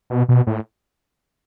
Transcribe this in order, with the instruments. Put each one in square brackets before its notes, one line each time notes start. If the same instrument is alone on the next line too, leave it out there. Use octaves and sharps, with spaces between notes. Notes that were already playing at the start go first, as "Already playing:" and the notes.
[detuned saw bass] B2
B2
A2